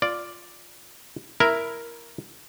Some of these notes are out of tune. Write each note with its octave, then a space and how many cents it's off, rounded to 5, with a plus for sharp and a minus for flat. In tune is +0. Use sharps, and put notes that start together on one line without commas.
F4 +0 D5 +0
E4 +0 A#4 +0